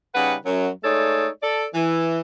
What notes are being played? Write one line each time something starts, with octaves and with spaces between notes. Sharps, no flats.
C#3 G3 D#4 B4 F#5
F#2 F#3
G#3 A3 D#4 A4 C#5 D5
A4 D5
E3